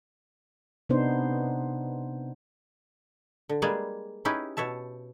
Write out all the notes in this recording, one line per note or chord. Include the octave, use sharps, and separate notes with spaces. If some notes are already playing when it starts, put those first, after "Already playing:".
C3 B3 D4 D#4 C5
D3
G3 G#3 A#3 G#4 B4 D5
C#4 D#4 E4 G4 G#4 B4
B2 C#5 E5 A5